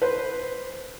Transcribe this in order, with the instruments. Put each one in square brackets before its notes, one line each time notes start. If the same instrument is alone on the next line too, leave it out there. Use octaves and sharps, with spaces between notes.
[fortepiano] B4 C5